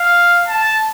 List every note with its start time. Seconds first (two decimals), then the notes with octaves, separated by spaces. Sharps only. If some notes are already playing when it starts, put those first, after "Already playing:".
Already playing: F5
0.48 A5